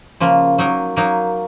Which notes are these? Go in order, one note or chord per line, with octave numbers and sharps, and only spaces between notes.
C#3 F3 A#3
F#3 A#3 D#4 A#4
F#3 A#3 D#4 A#4